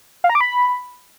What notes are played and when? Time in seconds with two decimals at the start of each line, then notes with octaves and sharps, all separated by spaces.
0.24 F5
0.30 A#5
0.35 D6
0.41 B5